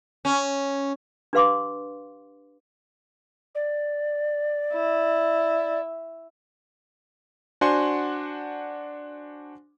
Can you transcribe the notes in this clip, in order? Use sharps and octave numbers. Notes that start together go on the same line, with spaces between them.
C#4
D4 G4 B4 F5 C6 D6
D5
E4
D4 F#4 C5 F#5 G#5 C6